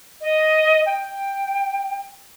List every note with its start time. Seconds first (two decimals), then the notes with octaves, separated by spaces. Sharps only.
0.21 D#5
0.86 G5